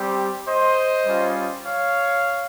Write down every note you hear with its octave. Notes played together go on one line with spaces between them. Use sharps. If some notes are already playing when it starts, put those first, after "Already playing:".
Already playing: G3 C4 G4
C5 D#5
G3 C#4 F4
C#5 F5